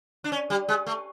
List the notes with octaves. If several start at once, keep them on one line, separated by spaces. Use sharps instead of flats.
D4
C#4
G3
G#3
A3